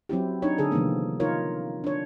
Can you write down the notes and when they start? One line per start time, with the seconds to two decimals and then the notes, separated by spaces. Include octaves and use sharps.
0.09 F#3 C4 E4 G4
0.42 D4 D#4 C#5
0.58 D3 G#4 A4
0.71 C3 D#3 F3 G3 A#3 B3
1.20 D#4 F4 A#4 C#5
1.84 D4 C#5